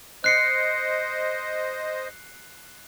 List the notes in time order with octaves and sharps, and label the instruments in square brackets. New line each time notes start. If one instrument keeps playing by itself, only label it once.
[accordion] C5 D#5 [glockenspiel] F#6 C7 C#7